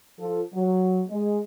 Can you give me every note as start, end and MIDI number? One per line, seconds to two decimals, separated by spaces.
0.19 0.41 53
0.19 0.41 65
0.19 0.41 69
0.54 1.01 54
1.09 1.40 56